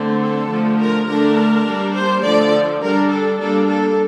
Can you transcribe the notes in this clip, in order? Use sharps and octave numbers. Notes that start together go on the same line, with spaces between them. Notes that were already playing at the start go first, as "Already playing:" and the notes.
Already playing: D3 A3 C4
A4
D3 F3 A3
A#4
D3 A3 D4 A#4
G3 A#3 D4
C5
D3 F3 A3 D5
G3 D4 A#4
A4
G3 A#3 D4 A4
A4